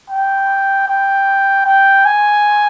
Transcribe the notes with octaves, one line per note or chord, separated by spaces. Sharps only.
G5
G5
G5
G#5